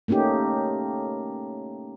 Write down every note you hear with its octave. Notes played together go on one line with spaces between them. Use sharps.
A3 A#3 C#4 D#4 G4